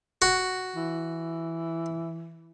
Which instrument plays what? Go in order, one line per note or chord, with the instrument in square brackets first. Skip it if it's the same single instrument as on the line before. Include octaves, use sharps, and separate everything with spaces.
[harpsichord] F#4
[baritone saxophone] E3